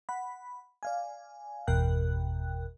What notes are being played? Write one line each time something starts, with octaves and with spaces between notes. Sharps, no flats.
F#5 B5
D5 F5 G#5
G1 E2 B2 A#4 G5 F#6